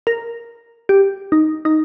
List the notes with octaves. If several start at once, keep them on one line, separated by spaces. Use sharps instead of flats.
A#4
G4
D#4
D#4